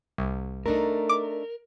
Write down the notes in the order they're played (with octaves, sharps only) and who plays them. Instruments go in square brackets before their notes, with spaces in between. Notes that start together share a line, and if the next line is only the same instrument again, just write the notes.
[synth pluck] C2
[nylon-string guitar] A3 D4 D#4 [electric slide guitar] A#4
[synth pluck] D6